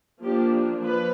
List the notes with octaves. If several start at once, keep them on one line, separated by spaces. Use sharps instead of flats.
F3 A#3 D4 G4
F3 B4